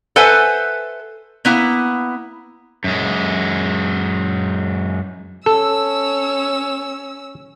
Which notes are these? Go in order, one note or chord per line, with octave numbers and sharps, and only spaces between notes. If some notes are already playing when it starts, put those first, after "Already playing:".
A4 B4 C5 E5 F#5 G#5
A#3 B3 E4
F#2 G#3
C#4 A4 E6